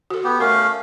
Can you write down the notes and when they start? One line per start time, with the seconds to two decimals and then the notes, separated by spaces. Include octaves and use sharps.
0.10 F#4 A4
0.24 B3 G4
0.40 A3 C#4 A#4 F5